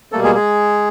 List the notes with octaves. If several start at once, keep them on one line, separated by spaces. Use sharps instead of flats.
B2 G3 A3 A#3 A4
G#3 G#4
G#3 G#4